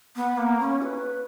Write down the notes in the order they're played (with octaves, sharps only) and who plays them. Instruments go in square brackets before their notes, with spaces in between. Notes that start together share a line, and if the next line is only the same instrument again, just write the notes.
[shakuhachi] B3
A#3
C#4
B4